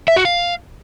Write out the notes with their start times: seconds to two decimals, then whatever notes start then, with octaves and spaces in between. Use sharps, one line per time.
0.08 E5
0.17 F#4
0.25 F5